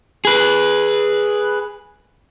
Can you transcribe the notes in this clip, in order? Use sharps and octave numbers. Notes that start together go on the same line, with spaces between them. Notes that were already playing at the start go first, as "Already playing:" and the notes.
G#4 B4